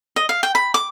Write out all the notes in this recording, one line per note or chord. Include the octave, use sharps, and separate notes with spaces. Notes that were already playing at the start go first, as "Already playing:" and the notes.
D#5
F5
G5
B5
D6